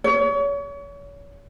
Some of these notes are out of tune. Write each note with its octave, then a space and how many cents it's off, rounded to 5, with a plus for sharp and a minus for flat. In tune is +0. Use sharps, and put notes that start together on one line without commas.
C#5 +35